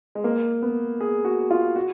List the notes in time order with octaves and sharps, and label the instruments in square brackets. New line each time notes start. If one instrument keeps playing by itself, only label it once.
[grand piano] G#3
A#3
B3
G#4
F#4
F4
F#4